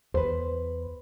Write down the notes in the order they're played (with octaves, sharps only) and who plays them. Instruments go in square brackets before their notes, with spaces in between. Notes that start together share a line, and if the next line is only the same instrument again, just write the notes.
[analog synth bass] E2 [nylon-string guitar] B4 C5